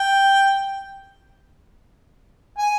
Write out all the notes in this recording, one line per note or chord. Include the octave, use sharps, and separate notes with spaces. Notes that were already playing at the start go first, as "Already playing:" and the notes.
Already playing: G5
G#5